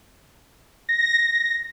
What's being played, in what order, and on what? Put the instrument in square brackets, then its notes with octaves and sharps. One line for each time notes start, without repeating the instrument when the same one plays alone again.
[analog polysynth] A#6